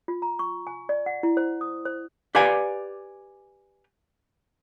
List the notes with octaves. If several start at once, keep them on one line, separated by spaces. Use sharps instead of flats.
F4
A#5
C#6
G#5
D5
F#5
E4
C5
D#6
C5
G4 B4 D5 F5 G#5